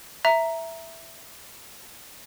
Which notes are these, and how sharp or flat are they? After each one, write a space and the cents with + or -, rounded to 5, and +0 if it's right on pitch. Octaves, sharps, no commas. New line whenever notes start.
E5 +0 A#5 +0